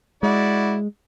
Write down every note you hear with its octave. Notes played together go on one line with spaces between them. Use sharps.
G#3 E4 F#4 D5